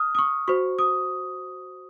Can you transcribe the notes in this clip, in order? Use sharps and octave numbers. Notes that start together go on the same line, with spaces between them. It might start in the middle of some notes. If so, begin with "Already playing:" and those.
Already playing: D#6 F6
D#6
C#6
F#4 C5 C#6
D#6